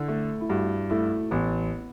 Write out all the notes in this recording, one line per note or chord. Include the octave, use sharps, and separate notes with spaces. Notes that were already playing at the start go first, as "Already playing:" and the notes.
Already playing: D3 E4
A3
E4
G2 F#4
A3 E4
A1 B3